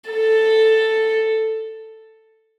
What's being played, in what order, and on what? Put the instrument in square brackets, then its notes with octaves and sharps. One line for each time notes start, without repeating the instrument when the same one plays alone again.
[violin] A4